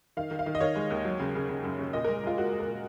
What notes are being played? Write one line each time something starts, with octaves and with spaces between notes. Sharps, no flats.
D#3 F5
D#3
F5
D#3
D#5
D#3 C#5
G#3
D#2
F#3
C#3
C#3
C#3
F#2
C#3
A#2 D#5
G#3 A#4
G#3 F4
G#3 F#4
G#3
A#4
A#2